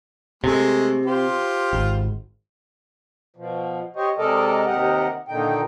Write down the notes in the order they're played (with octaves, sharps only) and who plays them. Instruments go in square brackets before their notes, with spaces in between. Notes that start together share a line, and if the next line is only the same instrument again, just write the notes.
[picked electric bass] C3 [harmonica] G#3 A3
[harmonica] F4 G4 C5
[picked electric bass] G#1
[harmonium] B2 F3
G4 C5 C#5 D#5
C3 G#3 A4 A#4 D5 D#5
D#2 C3 G4 A#4 D#5 F#5
A#2 D3 D#3 D#4 G5